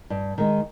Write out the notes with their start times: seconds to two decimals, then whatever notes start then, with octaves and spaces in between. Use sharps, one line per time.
0.10 G2
0.38 D#3 G#3